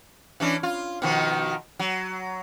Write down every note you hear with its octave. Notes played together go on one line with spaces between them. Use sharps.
E3 C#4 D4
F4
B2 D#3 F3
F#3